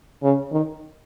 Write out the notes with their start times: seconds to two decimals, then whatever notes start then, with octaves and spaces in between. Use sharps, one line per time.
0.23 C#3
0.52 D#3